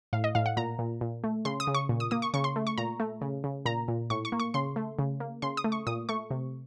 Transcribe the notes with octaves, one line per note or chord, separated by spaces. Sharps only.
A2 F5
D#5
A2 F5
F#5
A#2 A#5
A#2
A#2
A3
C#3 C6
D#6
C#3
C#6
A#2
D#6
A#3 D#6
C#6
C#3 C#6
C6
A3
C#6
A#2 A#5
A3
C#3
C#3
A#2 A#5
A#2
A2 C#6
C#6
A#3
C#6
C#3 C6
A3
C#3
A#3
C#3 C6
D#6
A3
C#6
A#2 D#6
A3 C#6
C3